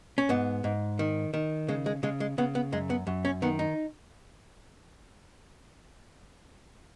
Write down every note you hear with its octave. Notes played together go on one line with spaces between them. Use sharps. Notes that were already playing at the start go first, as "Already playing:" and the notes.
C#4
G#2 B3
G#2
D#3
D#3
C#3 G#3
G#3
C#3 G#3
G#3
C#3 B3
B3
F#2 G#3
B3
F#2
C#4
D#3 B3
D#4